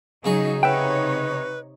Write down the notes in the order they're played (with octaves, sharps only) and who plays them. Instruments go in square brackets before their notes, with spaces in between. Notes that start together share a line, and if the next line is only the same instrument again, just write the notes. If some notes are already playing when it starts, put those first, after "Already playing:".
[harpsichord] C#3 G#4 C#6 [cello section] F#3 D#4
[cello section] C3 D#4 C#5 [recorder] B4 [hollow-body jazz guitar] E5 F#5 G5